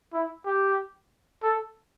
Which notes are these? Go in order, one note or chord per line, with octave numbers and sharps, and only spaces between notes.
E4
G4
A4